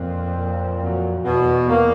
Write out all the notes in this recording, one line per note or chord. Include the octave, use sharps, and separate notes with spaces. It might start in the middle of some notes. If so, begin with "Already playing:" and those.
Already playing: F2 A#2 C4
A#2
F2 F#3
E2 B2
A#3